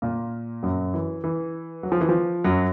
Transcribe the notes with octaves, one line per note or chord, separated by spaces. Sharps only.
A#2 A#3
F#2 F#3
E3
E3
F#3
F3
E3
F3
F#2 F#3